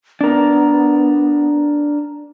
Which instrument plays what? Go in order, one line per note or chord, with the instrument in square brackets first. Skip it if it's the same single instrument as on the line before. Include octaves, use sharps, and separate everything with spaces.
[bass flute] B3 [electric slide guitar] D4 A#4